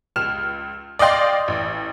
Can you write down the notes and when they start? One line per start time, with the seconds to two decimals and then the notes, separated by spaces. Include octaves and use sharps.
0.16 C#2 F6 E7
0.99 D5 D#5 F5 G5 C6
1.48 A1